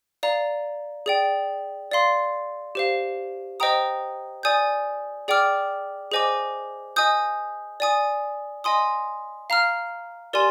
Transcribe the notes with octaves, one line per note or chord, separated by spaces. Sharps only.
D5 F5 A#5
G#4 D5 G5
D5 F5 C6
G4 C5 F5
C5 D#5 G5 A#5 D#6
D5 G#5 D#6 G6
G#4 D5 G5 D6 F6
G#4 C5 D#5 G#5 D6
D#5 G#5 D#6 G6
D5 G#5 D#6
D#5 G#5 C6 D#6
F5 A#5 F6
G4 A#4 D5 G#5 C6